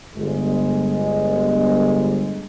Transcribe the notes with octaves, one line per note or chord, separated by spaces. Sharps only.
G1 G#3